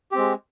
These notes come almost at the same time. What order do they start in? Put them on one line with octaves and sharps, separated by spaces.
G4 C4 G#3